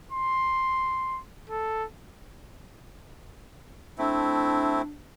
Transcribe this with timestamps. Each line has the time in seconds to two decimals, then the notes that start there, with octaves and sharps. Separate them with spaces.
0.12 C6
1.49 A4
3.98 A3 C4 D4 E4